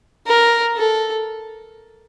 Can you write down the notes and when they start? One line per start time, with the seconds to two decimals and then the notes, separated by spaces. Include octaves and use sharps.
0.27 A#4
0.76 A4